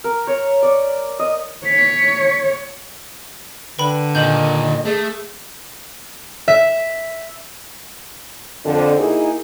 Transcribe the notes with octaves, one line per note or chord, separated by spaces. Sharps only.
A#4
C#5
D5
D#5
C#5 B6
D3 B4 G5 B5
A#2 D#3 D#5 G6 F#7
A3 G#4
E5
F2 D3
A#3 D#4 E4 F#4 G#4